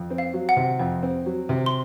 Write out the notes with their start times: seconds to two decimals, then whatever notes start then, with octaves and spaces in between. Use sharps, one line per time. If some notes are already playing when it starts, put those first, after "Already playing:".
Already playing: F2
0.10 C4
0.18 F5
0.33 F#3
0.49 F#5
0.56 C3
0.79 F2
1.03 C4
1.26 F#3
1.49 C3
1.66 C6